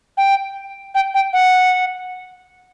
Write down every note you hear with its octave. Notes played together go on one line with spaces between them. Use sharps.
G5
G5
G5
F#5